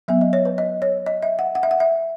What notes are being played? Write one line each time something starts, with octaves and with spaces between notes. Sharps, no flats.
F#3 B3 E5
D#5
C#5
B4
D#5
C#5
D#5
E5
F#5
F#5
E5
F#5
E5